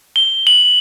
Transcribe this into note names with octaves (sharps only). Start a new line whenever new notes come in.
G7
F#7